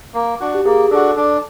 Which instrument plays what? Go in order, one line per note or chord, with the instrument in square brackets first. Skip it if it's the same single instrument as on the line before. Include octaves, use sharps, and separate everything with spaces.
[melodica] A#3
D4 F#4
[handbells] G4
[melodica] A#3 [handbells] G#4
[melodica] D4 F#4 [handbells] A4
[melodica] D4